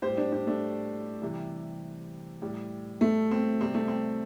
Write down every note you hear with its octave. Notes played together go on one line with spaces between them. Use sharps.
A2 G3 G4 C5
D4 G4
D4 G4
A3 D4
C3 E3 G3
A2 G3
A3
C4
C3 G3 C4
A3
C4